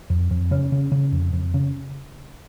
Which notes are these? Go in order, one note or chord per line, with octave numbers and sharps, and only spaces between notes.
F2
F2
C#3 C#4
C#3
C#3
F2
F2
C#3